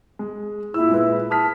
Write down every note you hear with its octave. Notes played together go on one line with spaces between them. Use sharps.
G#3
A#2 E4 E6
A#2 G#3 B4
A5 D#6 F6 B6